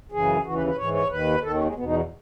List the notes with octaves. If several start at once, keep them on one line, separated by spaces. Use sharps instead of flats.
F#2 C#3 E3 G#4
D#2 C#3 E3 F#4
B4
B4
G#2 E3 C#5
C#5
D#2 D#3 B4
D#2 D#3 A4
C#4
G#3
E2 B2 B3
D#4